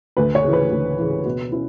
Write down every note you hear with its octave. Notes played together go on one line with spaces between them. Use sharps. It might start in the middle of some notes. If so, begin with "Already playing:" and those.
D2 B4
C#5
C#3 E3
B4
D2
C#3 E3
B2
C#4 E4